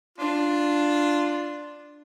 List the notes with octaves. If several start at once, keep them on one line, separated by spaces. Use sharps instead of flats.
D4 F4